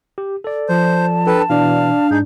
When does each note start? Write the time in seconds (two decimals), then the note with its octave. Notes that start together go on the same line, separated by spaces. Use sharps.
0.18 G4
0.44 A4 D5
0.69 F3 C5 A5
1.27 D4 A4 B4 G5
1.50 B2 E3 D4 F5
2.11 G#2 D#4 G#4 G6